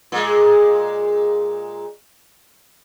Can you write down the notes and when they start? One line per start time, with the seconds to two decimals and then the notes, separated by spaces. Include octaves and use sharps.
0.12 A#2 G#3